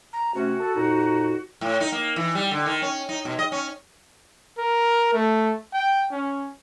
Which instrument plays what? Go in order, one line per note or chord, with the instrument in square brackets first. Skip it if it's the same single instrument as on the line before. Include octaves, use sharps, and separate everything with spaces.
[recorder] A#5
[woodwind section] C3 A3 C#4 [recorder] F#4
[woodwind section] A4
F2 A#2 D#4
[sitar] A2
D#4
A#3
E3
G3
D3
D#3
C#4
D#4
B2
D#5
C#4
[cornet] A#4
A3
G5
C#4